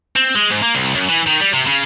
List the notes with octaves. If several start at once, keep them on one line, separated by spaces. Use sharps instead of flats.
C4
G#3
G#2
A#3
C2
F#2
E3
D#3
G3
C3
C#3